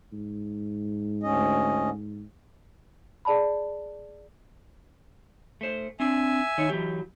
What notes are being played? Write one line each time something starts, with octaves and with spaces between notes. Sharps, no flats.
G#2
D2 C#4 D#5
G#4 D5 A5 B5
A3 C5
C4 D4 E5 G#5
D#3 D#4 C#5
E3 F#3 G4